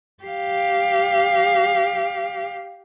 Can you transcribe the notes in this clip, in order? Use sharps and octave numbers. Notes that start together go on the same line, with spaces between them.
G4 F5